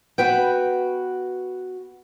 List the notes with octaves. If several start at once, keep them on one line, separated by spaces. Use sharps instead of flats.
B3 F#4 B4 G5